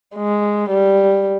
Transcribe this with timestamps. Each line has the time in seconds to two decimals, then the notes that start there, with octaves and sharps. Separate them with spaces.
0.16 G#3
0.70 G3